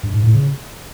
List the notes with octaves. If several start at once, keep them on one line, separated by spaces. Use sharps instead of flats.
G2
G#2
A2
C#3